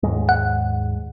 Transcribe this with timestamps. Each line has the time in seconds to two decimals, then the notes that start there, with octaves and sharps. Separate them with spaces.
0.03 D#2 G#2 G#3
0.29 F#5